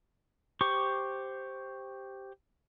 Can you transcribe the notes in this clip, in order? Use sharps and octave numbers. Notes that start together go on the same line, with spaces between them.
G4 C5 C#6 D6